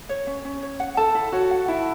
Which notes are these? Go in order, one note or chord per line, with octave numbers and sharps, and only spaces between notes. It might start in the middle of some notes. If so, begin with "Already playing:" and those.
C#5
C#4
C#4
C#5
F#5
A4 A5
E4
F#4 C#5
F#5
E4 A5